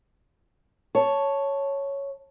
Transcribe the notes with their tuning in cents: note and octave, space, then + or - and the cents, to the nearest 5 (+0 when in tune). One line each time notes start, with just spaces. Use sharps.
C#5 +0 A5 +0